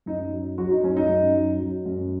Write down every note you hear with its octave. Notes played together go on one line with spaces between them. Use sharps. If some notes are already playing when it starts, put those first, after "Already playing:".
F#2 D#4
F#3
F#3 F#4
D#4
F#2 C#4
D#4
F#2
F#3
F#3
F#2